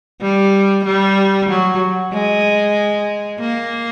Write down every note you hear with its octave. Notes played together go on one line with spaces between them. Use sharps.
G3
G3
F#3
G#3
A#3